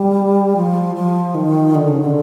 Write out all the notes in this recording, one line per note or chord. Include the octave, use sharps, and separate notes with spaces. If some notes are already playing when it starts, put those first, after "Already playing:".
Already playing: G3
F3
F3
D#3
D3
C#3
D3